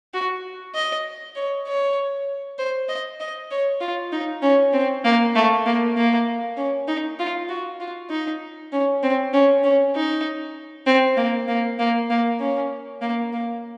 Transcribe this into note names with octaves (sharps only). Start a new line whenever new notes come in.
F#4
D#5
C#5
C#5
C5
D#5
D#5
C#5
F4
D#4
C#4
C4
A#3
A3
A#3
A#3
C#4
D#4
F4
F#4
F4
D#4
C#4
C4
C#4
C#4
D#4
C4
A#3
A#3
A#3
A#3
C#4
A#3
A#3